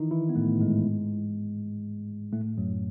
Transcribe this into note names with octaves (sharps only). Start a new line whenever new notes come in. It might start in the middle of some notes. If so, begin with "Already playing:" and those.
Already playing: D#3 E3 D#4 E4
E3 E4
B3
A2 A3
G#2 G#3
A2 A3
F#2 F#3